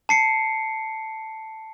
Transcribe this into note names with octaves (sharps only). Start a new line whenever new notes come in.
A5 C7 C#7